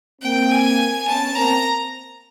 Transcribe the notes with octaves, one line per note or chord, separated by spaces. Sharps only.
A#3 C4 G5
G#5
B3 C#4 A5
A#3 C4 A#5